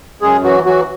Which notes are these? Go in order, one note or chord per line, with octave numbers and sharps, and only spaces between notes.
F#2 G#3 G#4
E3 F#3 F#4
E3 F#3 F#4